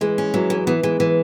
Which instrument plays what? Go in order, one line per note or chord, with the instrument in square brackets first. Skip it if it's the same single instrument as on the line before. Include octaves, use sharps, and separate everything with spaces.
[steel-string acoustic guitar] E3 [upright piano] G#3
[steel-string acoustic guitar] C#4
[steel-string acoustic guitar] E3 [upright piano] F#3
[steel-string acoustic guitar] E3 [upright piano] G#3
[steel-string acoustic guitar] E3 [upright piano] B3
[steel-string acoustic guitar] E3 [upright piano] G#3
[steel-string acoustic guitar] E3